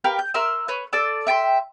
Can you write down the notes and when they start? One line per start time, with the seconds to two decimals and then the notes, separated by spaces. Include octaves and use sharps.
0.04 G4 A#4 B4 F5
0.19 G6
0.34 A#4 E5 C6 E6
0.68 B4 C#5
0.93 A4 D5 D6 E6
1.27 E5 G5 A5 C6